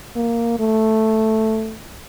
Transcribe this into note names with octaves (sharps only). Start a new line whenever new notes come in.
A#3
A3